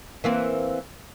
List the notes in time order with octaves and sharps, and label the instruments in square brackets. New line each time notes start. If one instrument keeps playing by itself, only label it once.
[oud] E3 A#3 C4